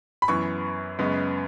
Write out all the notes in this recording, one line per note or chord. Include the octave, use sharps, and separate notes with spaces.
B5
F#2 E3 B3 C#6
F#2 C#3 G#3 B3